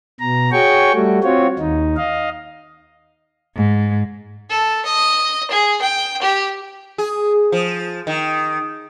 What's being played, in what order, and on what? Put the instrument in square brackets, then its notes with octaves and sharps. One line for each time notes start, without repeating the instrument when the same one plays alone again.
[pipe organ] B2 A#5
F#4 G#4 C#5 G5 C#6
G3 A3 F#4
C4 F4 F#4 C#5
D#2 D#4
D#5 F5
[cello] G#2
[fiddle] A4
D#5
G#4
G5
G4
[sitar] G#4
F3
D#3